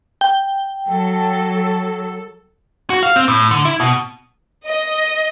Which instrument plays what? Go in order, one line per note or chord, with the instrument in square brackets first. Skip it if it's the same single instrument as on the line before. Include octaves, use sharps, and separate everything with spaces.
[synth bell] G5
[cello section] F#3 [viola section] A4
[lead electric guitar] F#4
F5
C4
A2
D3
E4
B2
[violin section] D#5